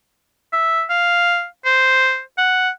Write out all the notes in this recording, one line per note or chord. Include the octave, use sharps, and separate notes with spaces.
E5
F5
C5
F#5